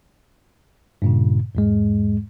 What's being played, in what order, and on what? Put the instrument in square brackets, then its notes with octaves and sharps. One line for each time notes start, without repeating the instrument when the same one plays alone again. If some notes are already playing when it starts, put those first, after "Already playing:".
[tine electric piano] G2 A#2 C#3
E2 G#2 G#3